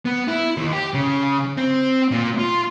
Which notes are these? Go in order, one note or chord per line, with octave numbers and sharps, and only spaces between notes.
B3
E4
D#2
G4
C#3
C4
A#2
F4